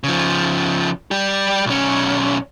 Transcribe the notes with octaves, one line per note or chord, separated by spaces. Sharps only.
C#3 F3
G3 G4
B1 C#4